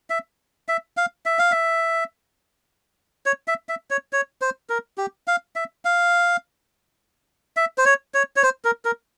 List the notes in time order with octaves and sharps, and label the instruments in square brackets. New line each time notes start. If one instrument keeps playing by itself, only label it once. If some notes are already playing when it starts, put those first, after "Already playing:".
[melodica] E5
E5
F5
E5
F5
E5
C#5
E5
E5
C#5
C#5
C5
A#4
G4
F5
E5
F5
E5
C5
C#5
C#5
C#5
C5
A#4
A#4